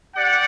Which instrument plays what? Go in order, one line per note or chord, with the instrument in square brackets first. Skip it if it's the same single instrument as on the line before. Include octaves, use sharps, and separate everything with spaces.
[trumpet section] G4 D5 F#5